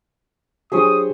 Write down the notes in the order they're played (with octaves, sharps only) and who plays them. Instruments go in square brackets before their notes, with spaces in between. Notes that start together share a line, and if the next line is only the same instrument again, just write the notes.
[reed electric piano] F#3 D4 G4 [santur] G#4 C5 C#5 [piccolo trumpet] D#6